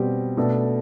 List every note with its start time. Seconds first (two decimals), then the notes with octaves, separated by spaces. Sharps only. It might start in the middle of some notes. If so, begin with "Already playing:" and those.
Already playing: B2 G3 C4 G4
0.37 B2 A3 D4 A4